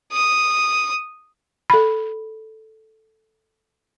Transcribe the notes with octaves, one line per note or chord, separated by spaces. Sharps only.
D#6
A4 B5